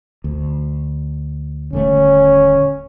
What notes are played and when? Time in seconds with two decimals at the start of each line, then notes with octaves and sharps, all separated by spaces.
0.24 D2
1.73 D#1 D3 A3 C#4